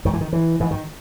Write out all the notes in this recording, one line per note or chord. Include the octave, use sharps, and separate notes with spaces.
G#2 D#3
E3
D#3
E3
G#2 E3
D#3